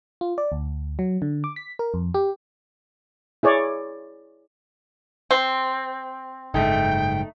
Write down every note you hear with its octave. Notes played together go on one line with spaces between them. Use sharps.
F4
D5
D2
F#3
D3
D6
B6
A#4
F2
G4
E4 G#4 C#5 D5
C4
F#1 G#2 A3 D#4 G5